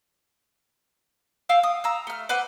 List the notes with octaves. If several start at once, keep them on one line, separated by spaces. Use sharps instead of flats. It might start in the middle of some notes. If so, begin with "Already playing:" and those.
F5 G5 E6
D#6
A#5 E6
A3 F6
B4 C5 F#5 D6